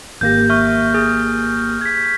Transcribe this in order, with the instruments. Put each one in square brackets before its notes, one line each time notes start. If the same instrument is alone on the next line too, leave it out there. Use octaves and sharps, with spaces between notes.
[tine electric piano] G#1 A#3 G4 [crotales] G6 A#6
[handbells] E5 [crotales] C#6 F6 G6
[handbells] G#4
[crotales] G#6 B6